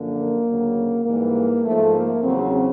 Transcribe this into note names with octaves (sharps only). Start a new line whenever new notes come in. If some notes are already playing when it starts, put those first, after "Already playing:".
Already playing: F#2 D3 F3 A#3
D2 C#3 F#3
G#2 E3 G3 A#3
G#2 F3 A3
A#3
E2 C#3 F#3 C4